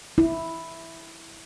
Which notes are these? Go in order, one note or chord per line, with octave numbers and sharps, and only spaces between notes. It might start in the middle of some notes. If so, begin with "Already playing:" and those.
E4